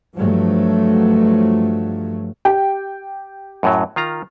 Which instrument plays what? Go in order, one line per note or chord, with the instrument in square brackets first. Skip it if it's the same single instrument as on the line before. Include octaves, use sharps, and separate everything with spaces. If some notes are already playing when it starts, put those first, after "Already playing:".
[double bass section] G2 F3 F#3 A3
[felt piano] G4 G5
[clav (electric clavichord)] F#2 A2 F#3
D#3 F4 A#5